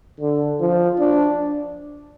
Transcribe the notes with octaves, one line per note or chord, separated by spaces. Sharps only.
D3
F3
D4